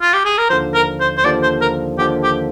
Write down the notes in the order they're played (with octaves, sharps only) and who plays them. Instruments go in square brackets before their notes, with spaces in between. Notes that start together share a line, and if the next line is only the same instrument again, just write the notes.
[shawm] F4
G4
G#4
A#4
[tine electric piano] D#2 D3 F3 [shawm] C5
[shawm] A#4
C5
C5
[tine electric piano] D#2 D3 F3 [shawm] D5
[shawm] C5
A#4
[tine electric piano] D#2 D3 F3 [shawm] G4
[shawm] G4